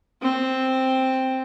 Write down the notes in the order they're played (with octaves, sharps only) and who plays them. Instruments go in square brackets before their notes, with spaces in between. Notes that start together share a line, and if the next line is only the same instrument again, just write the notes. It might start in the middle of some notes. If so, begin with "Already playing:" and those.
[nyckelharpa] C4